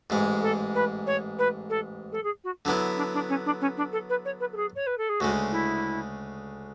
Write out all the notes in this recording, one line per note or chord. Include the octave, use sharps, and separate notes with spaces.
A1 G#2 G#3
A4
B4
C#5
B4
A4
A4
G#4
F#4
D3 F#3 B3 D4 E4
D4
D4
C#4
D4
C#4
D4
A4
B4
C#5
B4
A4
G#4
C#5
B4
A4
G#4
D2 C#3 G#3 F#4
E4